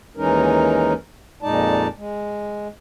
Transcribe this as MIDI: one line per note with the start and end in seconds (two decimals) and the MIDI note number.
0.17 0.93 39
0.17 0.93 52
0.17 0.93 56
0.17 0.93 61
0.17 0.93 63
0.17 0.93 70
1.42 1.87 41
1.42 1.87 46
1.42 1.87 56
1.42 1.87 63
1.42 1.87 74
1.42 1.87 81
1.97 2.68 56